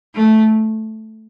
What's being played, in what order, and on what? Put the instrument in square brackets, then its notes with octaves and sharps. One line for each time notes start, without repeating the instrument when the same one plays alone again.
[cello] A3